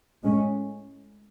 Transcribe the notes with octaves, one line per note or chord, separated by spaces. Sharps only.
A2 G#3 C#4